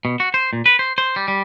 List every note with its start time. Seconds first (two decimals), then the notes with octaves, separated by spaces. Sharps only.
0.05 B2
0.20 F#4
0.34 C5
0.53 A#2
0.66 B4
0.79 C5
0.98 C5
1.16 G3
1.28 G3